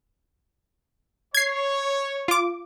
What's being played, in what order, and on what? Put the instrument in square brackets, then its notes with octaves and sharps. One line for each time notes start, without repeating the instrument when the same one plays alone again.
[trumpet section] C#5 [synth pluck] G#6 C7
[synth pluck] F4 D6